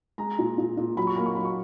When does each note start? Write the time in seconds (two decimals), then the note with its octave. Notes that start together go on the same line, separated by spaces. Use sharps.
0.18 G#3 A#5
0.39 A#2
0.58 A#2
0.77 A#2
0.97 F#3 B5
1.07 C#6
1.16 A#3 B5
1.26 C#6
1.35 F#3 B5
1.45 C#6